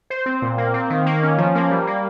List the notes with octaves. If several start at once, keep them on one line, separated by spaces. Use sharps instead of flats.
C5
C4
A#2
A#3
C4
D#3
A#3
C#4
F3
A#3
G3
A#3